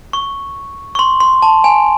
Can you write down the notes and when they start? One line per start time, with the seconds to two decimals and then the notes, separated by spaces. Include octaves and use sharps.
0.13 C#6
0.95 C#6
0.99 C6
1.20 C6
1.42 A5
1.64 G#5